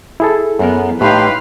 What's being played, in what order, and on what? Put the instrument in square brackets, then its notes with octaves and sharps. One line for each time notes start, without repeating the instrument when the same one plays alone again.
[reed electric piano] E4 G#4 A4
[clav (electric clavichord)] F#2 A#4 [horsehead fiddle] B3
[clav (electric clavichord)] A2 [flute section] D#4 G4 C6 [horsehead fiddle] B4 F5